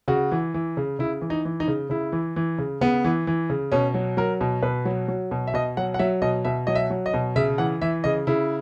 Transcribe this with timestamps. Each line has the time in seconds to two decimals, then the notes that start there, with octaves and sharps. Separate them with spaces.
0.08 C#3 F#4
0.32 E3
0.54 E3
0.77 C#3
0.99 C#3 E4
1.21 E3
1.30 D#4
1.45 E3
1.60 D#4
1.68 C#3
1.90 C#3 E4
2.12 E3
2.36 E3
2.58 C#3
2.81 C#3 B3
3.05 E3
3.27 E3
3.50 C#3
3.72 B2 C#4
3.94 F#3
4.17 F#3 A#4
4.41 B2
4.63 B2 B4
4.85 F#3
5.08 F#3
5.31 B2
5.47 E5
5.54 B2 D#5
5.77 F#3 F#5
5.94 F#5
5.99 F#3 E5
6.22 B2 D#5
6.45 B2 E5
6.67 F#3 D#5
6.75 E5
6.90 F#3
7.06 D#5
7.14 B2
7.36 C#3 E5
7.58 E3 F#5
7.82 E3 E5
8.04 C#3 D#5
8.27 C#3 E4